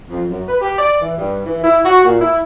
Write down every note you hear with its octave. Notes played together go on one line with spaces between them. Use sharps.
F2
F#2
B4
G4
D5
E3
G2
E3
E4
F#4
A#2
E4